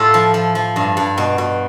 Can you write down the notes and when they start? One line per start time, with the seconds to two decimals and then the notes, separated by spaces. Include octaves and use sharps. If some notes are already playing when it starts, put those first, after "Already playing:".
Already playing: A2 F4 G4 A4
0.14 F3
0.34 F3
0.55 F3
0.76 G2
0.97 G2
1.18 B2
1.38 B2